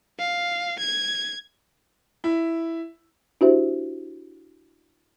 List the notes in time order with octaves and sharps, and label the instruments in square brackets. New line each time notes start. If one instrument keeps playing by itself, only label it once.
[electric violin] F5
G#6
[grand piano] E4
[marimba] D4 E4 F#4 G4 C5 E5